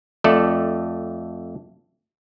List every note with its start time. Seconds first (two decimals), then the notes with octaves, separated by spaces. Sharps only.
0.24 F2 A3 A4 D5